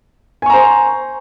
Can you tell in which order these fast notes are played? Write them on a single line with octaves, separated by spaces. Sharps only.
G#5 C#6 A#5 C5